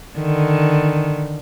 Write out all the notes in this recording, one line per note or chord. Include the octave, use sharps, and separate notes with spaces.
D3 D#3